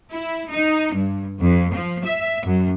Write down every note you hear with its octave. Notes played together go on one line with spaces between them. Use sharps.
E4
D#4
G2
F2
F3
E5
F#2